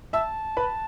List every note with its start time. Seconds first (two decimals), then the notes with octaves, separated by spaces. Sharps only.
0.13 E5 A5 E6
0.57 B4 B5